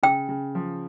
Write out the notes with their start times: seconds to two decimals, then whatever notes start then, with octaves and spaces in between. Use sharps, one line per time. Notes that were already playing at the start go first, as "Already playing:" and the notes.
0.03 C#3 G5
0.29 C#3
0.55 F3